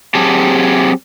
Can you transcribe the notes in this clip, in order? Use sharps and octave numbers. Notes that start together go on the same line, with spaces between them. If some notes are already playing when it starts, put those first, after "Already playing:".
F#3 C4 G4 G#4 A5